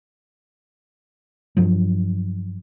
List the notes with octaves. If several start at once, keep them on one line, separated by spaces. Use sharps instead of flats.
G2 F3 F#3